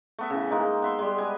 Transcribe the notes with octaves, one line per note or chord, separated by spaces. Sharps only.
A3 B3 E5
C#3 E3
G#3 A#3 D#4
B3 E5 C6
G3 G#3
B4 D#5 G#5